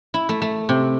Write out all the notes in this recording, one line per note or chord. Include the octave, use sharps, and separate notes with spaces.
E4
A3
A3
C3